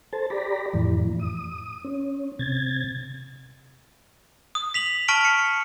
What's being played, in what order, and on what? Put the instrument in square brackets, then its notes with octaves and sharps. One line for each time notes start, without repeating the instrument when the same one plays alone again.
[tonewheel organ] A4 C5 A5
G4 D5 A#5 B5
F2 A2 E3
D#6
C#4
C3 G#6 A6
[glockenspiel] D#6
B6 F7 F#7
A5 C#6 F6 B6 D7 F#7
C#7